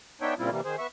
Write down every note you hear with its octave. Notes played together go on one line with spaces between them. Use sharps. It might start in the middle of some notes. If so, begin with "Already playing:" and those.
B3 D4 D#4 C#5 E5 G5
A#2 C#3 G3 C4 E4 F4
C3 E3 G3 A#3
D#3 G#4 C5
B3 E5 C#6